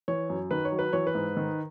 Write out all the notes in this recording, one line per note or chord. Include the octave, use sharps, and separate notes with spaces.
E3 C#5
F#2
D#3 B4
C#5
F#3
B4
E3 C#5
B4
G#2
D#3